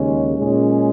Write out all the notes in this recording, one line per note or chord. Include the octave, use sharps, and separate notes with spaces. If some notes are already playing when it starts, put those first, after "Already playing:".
Already playing: D#2 C#3 G#3 C#4
A#2 G#3 C#4